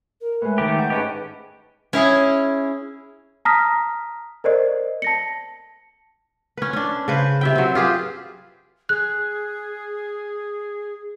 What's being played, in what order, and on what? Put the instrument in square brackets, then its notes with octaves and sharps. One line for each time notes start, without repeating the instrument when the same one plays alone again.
[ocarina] A#4
[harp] A2 G#3 [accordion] B4
[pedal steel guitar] D#3 A3 G4
[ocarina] F#5 [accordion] G6
[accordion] G#2 B4 A5 [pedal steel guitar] C#4 G4 [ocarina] D#5
[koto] C#4 E4 G#4
[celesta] A5 A#5 D#6 F6 A#6 B6
A#4 C5 D5 D#5
A5 A#6 C#7
[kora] C#4 B4
C#4 D4
C#3 B4 C5
C3 E5 G5
F#3 C4
F4 G4 G#4 B4
[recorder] G#4 [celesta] F#6